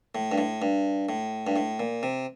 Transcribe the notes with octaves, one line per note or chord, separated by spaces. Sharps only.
A2
G2
A2
G2
A2
G2
A2
A#2
C3